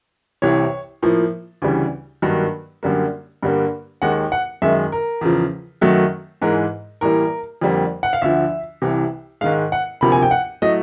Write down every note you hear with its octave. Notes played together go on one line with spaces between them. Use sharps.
C2 C3 E3 C#5
A2 F3 A#3
D2 C#3 E3 G3
G2 D#3 F#3 A#3
F#2 D3 G3 A#3
G2 D3 G3 A#3
D#2 D#3 G#3 F#5
F#5
F#2 D#3 G#3 E5
A#4
E2 C#3 F3
F#2 D#3 F#3 A3
G#2 E3 G#3 A#4
A2 E3 G3 A#3 A#4
F2 D3 G3 A#3
F#5
F5
D2 D3 F3 E5
C2 C3 E3
G#2 D#3 G#3 F5
F#5
D2 C3 F3 A#3 B5
G#5
G5
F#5
A2 F#3 A3 D#5